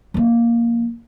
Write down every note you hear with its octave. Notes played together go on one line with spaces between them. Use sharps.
F3 A#3